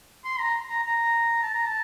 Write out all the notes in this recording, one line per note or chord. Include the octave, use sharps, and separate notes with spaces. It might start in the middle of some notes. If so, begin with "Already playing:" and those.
C6
A#5
A#5
A#5
A5
A#5
A5